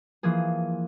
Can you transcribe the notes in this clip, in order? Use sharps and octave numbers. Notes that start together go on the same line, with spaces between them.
E3 F3 A#3 G#4